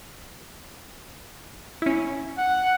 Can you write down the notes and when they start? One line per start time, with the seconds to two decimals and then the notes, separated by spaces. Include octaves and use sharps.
1.82 C#4 E4
2.38 F#5